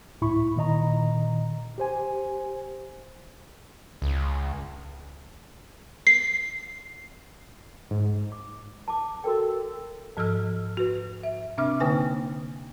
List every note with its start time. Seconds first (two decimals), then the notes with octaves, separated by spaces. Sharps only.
0.21 C#2 A2 E4 B5 C#6
0.56 A#2 D#3 D#5 A#5
1.78 G4 C5 G#5
4.02 C#2
6.07 C7
7.91 G#2
8.32 D6
8.88 A5 D6
9.24 F#4 A4 A#4 G5
10.17 G#2 F3 A4 D#5 E6 F6
10.77 F#4 B4
11.23 E5
11.58 C3 C4 D4 E5 D6 F6
11.80 D3 A#3 D#4 B4 G5 G#5